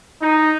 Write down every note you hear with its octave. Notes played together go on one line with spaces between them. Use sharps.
D#4